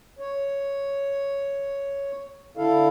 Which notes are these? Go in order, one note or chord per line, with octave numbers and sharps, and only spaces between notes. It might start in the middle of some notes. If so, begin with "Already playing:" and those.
C#5
D3 E4 A4 F5